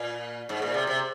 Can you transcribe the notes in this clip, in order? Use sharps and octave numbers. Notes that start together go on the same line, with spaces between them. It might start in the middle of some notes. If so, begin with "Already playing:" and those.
Already playing: A#2
G#2
A#2
C3
C3